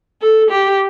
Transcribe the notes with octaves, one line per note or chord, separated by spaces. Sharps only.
A4
G4